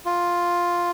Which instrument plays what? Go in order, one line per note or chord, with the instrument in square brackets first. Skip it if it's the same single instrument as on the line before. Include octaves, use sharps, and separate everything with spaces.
[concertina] F4